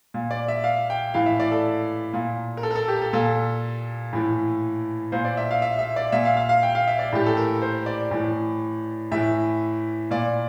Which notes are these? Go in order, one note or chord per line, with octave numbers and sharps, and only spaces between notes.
A#2
D5
E5
F5
G5
A2 E3 F5
E5
D5
A4
A#2
A#4
A4
A#4
A4
G4
A4
A#2 A4
A2 E3
A#2 C5
D5
E5
F5
E5
E5
D5
A#2 E5
F5
F5
F5
G5
F5
E5
D5
A2 E3 G4
A4
A#4
C5
D5
A2 E3
A2 E3 E5
A#2 D5